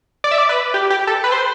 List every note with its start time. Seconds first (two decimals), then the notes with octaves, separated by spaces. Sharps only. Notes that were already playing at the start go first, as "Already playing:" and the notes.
0.24 D5
0.31 E5
0.38 D5
0.49 B4
0.74 G4
0.90 G4
1.07 A4
1.24 B4
1.32 C5